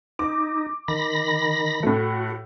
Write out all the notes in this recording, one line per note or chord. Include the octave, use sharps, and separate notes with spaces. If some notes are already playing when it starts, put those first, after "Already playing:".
D#4 D6
D#3 B5 A#6
A2 A3 F#4